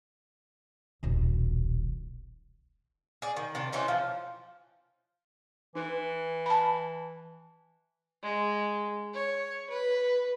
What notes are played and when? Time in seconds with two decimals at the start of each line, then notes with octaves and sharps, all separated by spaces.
1.03 D#1 B1
3.22 G#4 D5
3.37 D#3
3.55 C3 D4
3.72 E3 C4 C#4 D#4
3.88 F3
5.75 E3 D#4 B4
6.46 A5 B5
8.23 G#3
9.14 C#5
9.70 B4